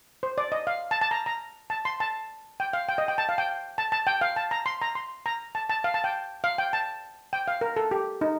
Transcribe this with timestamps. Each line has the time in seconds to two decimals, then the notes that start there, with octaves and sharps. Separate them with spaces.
0.23 C5
0.38 D5
0.52 D#5
0.67 F5
0.91 A5
1.01 A5
1.11 A#5
1.26 A#5
1.70 A5
1.85 C6
2.00 A5
2.60 G5
2.73 F5
2.89 G5
2.98 D#5
3.08 G5
3.18 A5
3.29 F5
3.38 G5
3.78 A5
3.92 A5
4.07 G5
4.21 F5
4.36 A5
4.51 A#5
4.66 C6
4.82 A#5
4.95 C6
5.26 A#5
5.55 A5
5.70 A5
5.84 F5
5.94 A5
6.04 G5
6.44 F5
6.58 G5
6.73 A5
7.33 G5
7.48 F5
7.61 A#4
7.76 A4
7.91 G4
8.21 D#4